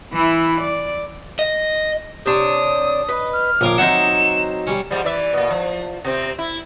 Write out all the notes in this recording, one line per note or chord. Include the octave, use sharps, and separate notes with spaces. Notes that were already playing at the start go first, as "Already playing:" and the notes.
E3 E4
D5
D#5
C3 D4 C#5 D#6
B4 D#5
F6
A#1 C#4 A#4 F5 D6
F#3 C4 D#4 E5 F#5 E7
G3 C#4
G#2 F3 G3
E3 D5 E5
B2 A#3
F3
C3 C4
E4